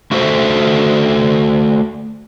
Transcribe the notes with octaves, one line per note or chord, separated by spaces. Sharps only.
A3 F#4 A4 C5 E5